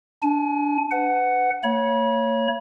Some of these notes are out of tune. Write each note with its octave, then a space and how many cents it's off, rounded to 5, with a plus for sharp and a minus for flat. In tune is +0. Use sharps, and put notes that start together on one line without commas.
D4 -10 G#5 +30
B4 +30 F#5 +0
A#3 -45 C#5 +0 B5 -40